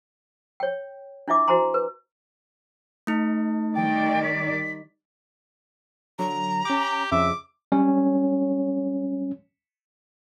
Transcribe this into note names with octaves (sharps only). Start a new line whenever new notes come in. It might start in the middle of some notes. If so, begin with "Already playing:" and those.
C#5 G5
D4 E4 F4 E5 D6
E4 F#4 C5 G#5 A#5 C6
B4
A3 D#4
D#3 G3 D5 G5
B6
D3 F#3 A#5
C#4 G4 D6
F2 C#3 E5 D6
G3 C#4 C#5